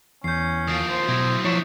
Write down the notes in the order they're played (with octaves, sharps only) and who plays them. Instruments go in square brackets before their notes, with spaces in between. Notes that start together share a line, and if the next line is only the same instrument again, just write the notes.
[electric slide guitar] E2 [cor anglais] C#4 [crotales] G6 C7
[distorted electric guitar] D#2 F3 [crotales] D#6 C7 D7
[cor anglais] C5
[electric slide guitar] B2 [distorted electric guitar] F#3 E4
[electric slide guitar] F3 E4 C#5 [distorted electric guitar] D4 E5